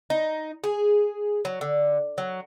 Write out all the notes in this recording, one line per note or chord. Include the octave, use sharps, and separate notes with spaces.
D#4
G#4
F#3
D3
F#3